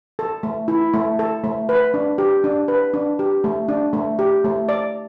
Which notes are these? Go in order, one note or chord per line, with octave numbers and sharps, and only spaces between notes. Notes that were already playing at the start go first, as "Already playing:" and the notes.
A4
A3
E4
A3
A4
A3
B4
D4
G4
D4
B4
D4
G4
A3
D4
A3
G4
A3
D5